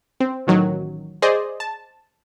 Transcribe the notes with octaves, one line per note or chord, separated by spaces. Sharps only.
C4
A1 D#3 F#3
G#4 C5 D5 D#5
A5